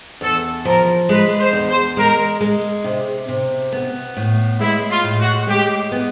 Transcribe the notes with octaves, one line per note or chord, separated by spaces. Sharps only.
E2 A4
F3 A#4
G#3 B4
C5
E2
C5
G#3 A#4
G#3
C3
C3
B3
A2
G#3 E4
F4
A2
F#4
G#3 G4
B3